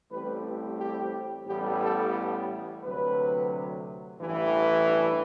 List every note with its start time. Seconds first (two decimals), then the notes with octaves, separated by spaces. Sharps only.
0.11 A1 A2 G3 C4 B4
0.79 G4
1.47 A1 A2 G3 B3 G4
1.81 A4
2.83 D2 C3 F#3 B4
4.18 A1 G2 E3
4.86 D4